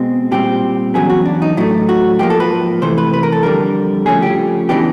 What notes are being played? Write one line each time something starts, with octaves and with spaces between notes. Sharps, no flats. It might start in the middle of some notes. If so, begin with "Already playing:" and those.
Already playing: B2 G#3 C4
A#2 G3 C4 G4
E2 C#3 F#3 B3 G#4
F#4
D4
D#4
A2 F#3 A3 D4 E4
F#4
G#2 F3 A#3 G4
A4
B4
C3 E3 A3 C5
B4
B4
A#4
A4
F2 D3 G3 A#4
C#3 F3 A3 C#4 G#4
G4
C#3 E3 G#3 B3 D4 G4